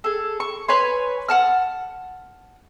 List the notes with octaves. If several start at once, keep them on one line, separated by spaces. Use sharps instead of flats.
G#4 A4
C#6
B4 C#5 G#5 C6
F#5 A5 F6